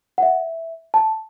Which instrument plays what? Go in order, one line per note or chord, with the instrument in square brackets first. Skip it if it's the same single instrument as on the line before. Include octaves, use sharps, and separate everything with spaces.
[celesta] F#5
E5
A5